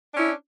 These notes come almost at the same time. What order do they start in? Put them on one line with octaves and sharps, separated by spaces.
D4 C#4 E4